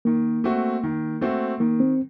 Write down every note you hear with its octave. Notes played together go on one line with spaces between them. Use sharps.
D#3 A#3
A3 C4 F#4
D#3
A3 C4 F#4
D#3 A#3
C4